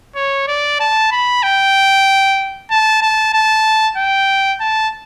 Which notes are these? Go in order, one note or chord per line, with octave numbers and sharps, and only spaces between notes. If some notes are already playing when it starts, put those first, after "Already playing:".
C#5
D5
A5
B5
G5
A5
A5
A5
G5
A5